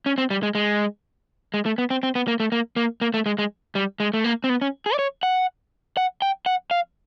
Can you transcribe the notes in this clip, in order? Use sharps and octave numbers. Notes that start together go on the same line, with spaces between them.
C#4
C4
G3
G#3
G#3
G#3
A3
B3
C4
C4
B3
A#3
A3
A#3
A#3
A#3
A3
G#3
G#3
G3
G#3
A3
A#3
C4
B3
C#4
G#4
D5
C#5
F#5
F#5
G5
F#5
F5